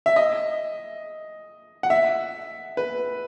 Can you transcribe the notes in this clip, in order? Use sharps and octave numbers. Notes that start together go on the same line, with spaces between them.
E5
D#5
F#5
E5
B4